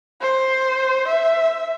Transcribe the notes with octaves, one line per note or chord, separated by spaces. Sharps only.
C5
E5